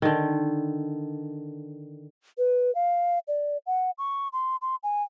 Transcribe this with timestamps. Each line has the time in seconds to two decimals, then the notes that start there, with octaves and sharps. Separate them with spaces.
0.02 D3 D#3
2.38 B4
2.75 F5
3.28 D5
3.67 F#5
3.98 C#6
4.33 C6
4.62 C6
4.83 G#5